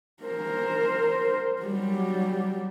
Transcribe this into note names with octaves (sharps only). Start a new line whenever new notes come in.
A#4 C5
F#3 G3